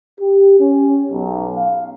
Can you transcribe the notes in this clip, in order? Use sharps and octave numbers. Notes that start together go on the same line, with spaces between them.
G4
C#4
B1
F5